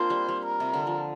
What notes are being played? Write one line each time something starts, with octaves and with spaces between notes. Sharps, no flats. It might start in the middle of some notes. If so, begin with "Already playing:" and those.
Already playing: A#3 C4 D4 F4 C5
G3
G3
A#4
C3
D3
F3